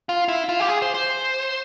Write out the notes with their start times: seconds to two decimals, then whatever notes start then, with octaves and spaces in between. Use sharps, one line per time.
0.09 F4
0.28 E4
0.49 F4
0.60 G4
0.68 G#4
0.82 C5
0.94 C5